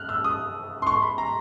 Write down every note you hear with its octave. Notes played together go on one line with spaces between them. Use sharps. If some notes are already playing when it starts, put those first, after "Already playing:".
Already playing: F6 F#6
E6
D#6
C6
C#6
C6
B5
A#5